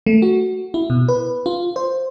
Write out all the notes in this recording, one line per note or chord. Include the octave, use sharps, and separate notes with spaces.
A3
F#4
E4
B2
B4
F4
C5